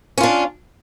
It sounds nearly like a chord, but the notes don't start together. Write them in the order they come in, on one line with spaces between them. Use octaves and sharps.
C#4 F4 D4